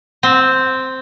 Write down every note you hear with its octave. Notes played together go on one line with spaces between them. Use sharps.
C4